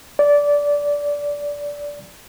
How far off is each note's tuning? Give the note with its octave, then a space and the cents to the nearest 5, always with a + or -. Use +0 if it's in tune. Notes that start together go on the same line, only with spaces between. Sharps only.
D5 -15